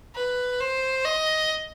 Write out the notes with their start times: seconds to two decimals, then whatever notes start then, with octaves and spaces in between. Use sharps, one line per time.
0.15 B4
0.60 C5
1.05 D#5